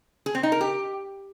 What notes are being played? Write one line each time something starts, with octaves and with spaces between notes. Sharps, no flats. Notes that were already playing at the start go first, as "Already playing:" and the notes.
G#4
C4
D#4
A#4
G4